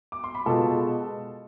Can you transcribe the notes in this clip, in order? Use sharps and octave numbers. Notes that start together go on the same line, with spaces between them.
D6
C6
B5
B2 G#3 B3 F4 A4 A5